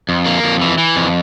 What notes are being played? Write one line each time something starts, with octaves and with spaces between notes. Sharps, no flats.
F2
A#3
F2
E3
E3
F2